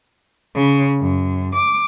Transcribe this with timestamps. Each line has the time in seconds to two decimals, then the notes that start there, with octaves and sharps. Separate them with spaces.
0.55 C#3
1.00 F#2
1.54 D6